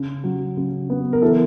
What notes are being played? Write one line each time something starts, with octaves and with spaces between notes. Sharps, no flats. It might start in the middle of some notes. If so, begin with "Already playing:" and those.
Already playing: C#3
F#3
C#3
B3
A#4
E3 A4